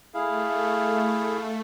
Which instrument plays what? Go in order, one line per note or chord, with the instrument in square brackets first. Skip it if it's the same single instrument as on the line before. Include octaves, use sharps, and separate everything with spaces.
[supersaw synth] A3 [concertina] E4 G#4 F5